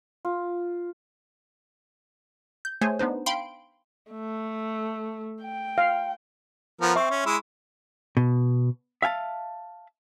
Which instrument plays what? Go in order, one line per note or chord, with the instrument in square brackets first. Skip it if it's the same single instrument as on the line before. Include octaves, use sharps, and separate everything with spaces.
[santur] F4
[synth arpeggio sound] G6
A3 G#4 C5 C#5 G#5
B3 D4 D#4 C5
F5 G5 B5 C6 D7
[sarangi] A3
G5
[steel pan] F5
[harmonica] F3 B3 A#4
[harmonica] C4 [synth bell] E5 C6 C#6
[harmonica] C#4
G#3 E4
[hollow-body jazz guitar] B2
E5 F5 G#5 A5